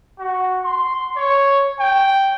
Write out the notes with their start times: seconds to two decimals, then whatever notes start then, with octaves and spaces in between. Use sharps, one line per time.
0.19 F#4
0.64 C6
1.16 C#5
1.80 G5